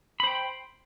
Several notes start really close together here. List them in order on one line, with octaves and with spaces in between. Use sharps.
B5 C5 G5